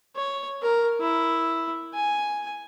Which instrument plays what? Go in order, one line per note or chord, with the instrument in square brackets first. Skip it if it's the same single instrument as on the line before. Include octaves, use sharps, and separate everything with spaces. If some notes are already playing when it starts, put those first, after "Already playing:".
[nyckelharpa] C#5
A#4
E4
G#5